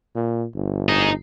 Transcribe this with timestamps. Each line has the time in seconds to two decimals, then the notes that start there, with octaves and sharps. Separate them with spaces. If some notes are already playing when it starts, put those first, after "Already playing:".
0.15 A#2
0.55 G1
0.89 D#4 G#4